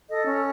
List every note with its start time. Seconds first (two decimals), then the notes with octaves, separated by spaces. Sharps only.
0.10 A4 D#5
0.27 C#4